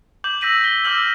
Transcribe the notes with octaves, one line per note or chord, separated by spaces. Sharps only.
D6 G6 F#7
E6 G6 A#6 B6 D#7 F#7
B6 G7
D6 E6 F6 G6 F#7